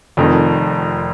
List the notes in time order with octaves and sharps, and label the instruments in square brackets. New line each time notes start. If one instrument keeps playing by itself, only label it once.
[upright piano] F1 F2 D#3